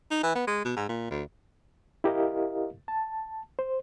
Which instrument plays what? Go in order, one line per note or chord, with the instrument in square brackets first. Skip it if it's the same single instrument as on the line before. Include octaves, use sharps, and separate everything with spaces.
[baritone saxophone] D#4
E3
B3
G#3
B2
G#2
A#2
D2
[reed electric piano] E4 G4 A#4 D#5 F5
A5
C5